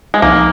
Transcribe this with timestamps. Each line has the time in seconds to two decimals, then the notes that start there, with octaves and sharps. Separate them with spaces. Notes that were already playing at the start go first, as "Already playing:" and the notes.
0.14 G#3
0.22 C2 C3 F3 A#3 C4 D#4